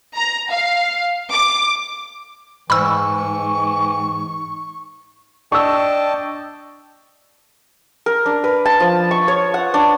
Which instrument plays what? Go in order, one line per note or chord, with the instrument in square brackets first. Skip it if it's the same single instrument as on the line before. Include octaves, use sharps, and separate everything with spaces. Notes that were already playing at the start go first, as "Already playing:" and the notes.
[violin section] A#5
F5
D6
[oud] G#2 [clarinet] E3 [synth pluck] B5 E6 [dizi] C#6
[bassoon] D4 [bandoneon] D#5 G5 A5 [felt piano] C#6 E6
[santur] A#4
D4
B4
A5
F3
C#6
C#5
F#5
D4